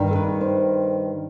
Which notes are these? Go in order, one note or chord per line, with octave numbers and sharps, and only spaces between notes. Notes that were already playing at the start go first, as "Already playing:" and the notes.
Already playing: G2 D#3 G3 D#4
A4
B4
C5